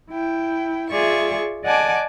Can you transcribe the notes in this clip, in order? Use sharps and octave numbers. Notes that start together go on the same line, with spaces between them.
E4 G5
F4 G#4 D5 E5 C#6
D5 D#5 F#5 G#5 A5 D6